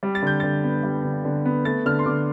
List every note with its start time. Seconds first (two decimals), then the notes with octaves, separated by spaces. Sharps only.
0.03 G3
0.15 A6
0.22 D3 G6
0.40 D3 A6
0.64 B3
0.83 G3
1.04 D3
1.25 D3
1.45 B3
1.65 A3 A6
1.86 D3 F6
1.99 C6
2.06 D3 D6